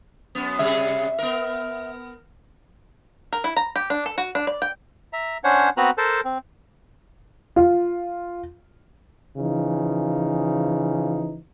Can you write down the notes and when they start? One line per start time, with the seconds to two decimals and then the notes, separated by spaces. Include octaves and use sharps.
0.35 F#2 B3
0.59 C3 G3 G#4 E5
1.19 B3 A#4
3.33 A#4
3.44 E4
3.56 A#5
3.76 G4
3.90 D4
4.06 A4
4.18 F#4
4.35 D4
4.47 D5
4.62 G5
5.13 E5 A#5
5.44 C#4 D4 C5 C#5 F#5
5.77 B3 C4 F#4 B4 A#5 F#6
5.98 A4 A#4 C5 A5
6.25 C4
7.56 F4
9.37 C#3 E3 F3 D#4